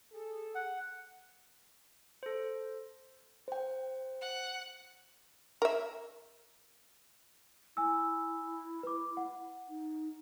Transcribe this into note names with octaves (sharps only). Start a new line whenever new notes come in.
G#4 A4
F#5
A4 C5
C5 G5
F#5
A#4 E5
E4 G#5 E6
B4 D6
F#5
D#4